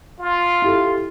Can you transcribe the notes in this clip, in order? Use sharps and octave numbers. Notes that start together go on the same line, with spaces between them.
F4
E4 G4 A4